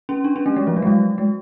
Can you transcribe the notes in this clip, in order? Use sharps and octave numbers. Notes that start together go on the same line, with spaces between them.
C#4
D4
C#4
A3
G#3
F3
F#3
G#3
F#3
G#3